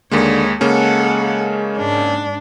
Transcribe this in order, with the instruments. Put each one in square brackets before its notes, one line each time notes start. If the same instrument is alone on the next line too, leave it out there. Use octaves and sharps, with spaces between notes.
[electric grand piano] D#2 G#3 A#3 [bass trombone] D3 [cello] C#5
[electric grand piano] C#3 A#3 C#4 [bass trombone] G#3 [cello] A4 F#5
[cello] G#2 D4